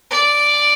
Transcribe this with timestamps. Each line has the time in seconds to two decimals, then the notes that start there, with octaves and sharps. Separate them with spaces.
0.11 D5